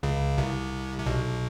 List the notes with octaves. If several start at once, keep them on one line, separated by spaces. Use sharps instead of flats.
C#2 C#3
C2 C3
C3
B1 B2